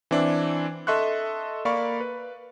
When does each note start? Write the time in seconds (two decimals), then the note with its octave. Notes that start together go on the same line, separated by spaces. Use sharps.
0.11 E3 C4 D4 E4
0.87 A4 D#5 E5 C6 C#6 F#6
1.65 A#3 D5 F5 B5 C#6
2.00 B4